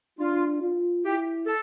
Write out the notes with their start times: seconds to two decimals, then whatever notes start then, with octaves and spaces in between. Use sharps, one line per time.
0.19 D4 F4
0.62 F4
1.05 E4 G4
1.46 A4